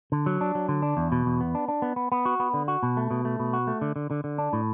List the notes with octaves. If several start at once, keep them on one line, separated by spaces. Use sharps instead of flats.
D3
F#3
D4
F#3
D3
D4
E2
B2
E2
B3
D4
D4
B3
B3
B3
F#4
B3
D3
F#4
B2
A3
B2
A3
B2
F#4
A3
D3
D3
D3
D3
D4
A2